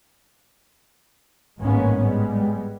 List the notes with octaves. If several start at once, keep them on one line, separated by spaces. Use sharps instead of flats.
G#1 A2 G#3 A#3 B3 C#4
G3 G#3 B3